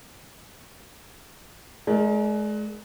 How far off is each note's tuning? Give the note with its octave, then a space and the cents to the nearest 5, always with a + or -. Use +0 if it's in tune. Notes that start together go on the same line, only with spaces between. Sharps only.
G#3 +35 A#4 +0 D5 +0